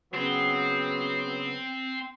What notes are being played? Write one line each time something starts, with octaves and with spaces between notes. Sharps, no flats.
C#3 F#3 B3 C4